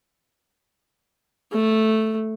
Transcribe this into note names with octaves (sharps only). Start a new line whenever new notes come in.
A3